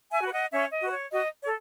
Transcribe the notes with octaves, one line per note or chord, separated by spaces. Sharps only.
E5 G#5
F#4 B4
D#5 F#5
C#4 C#5 E5
D#5
F#4 B4
C#5
F#4 D#5
C#5
A4